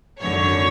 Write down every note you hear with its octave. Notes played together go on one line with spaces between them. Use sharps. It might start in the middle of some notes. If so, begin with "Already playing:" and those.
G#1 F#2 D3 C#5